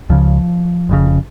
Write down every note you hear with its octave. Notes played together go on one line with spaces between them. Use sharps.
C#2 C#3 F3
F1 F2 C#3